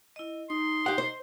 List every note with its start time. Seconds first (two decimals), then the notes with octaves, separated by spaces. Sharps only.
0.16 E4 D#5
0.50 D#4 C6 D#6
0.86 G4 F#5
0.98 C5